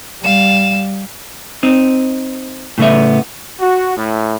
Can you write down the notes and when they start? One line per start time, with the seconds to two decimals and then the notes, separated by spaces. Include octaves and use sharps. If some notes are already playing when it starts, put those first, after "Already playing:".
0.24 G3 F5 E7
1.63 C4 D#4
2.78 A2 C#3 A3 B3 E5
3.60 F#4
3.96 A2